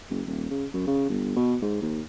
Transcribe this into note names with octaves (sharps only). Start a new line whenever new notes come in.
F#1
D#1
C#3
F#2
C#3
G1
B2
G#2
D#2